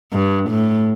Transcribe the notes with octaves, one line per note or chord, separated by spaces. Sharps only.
G2
A2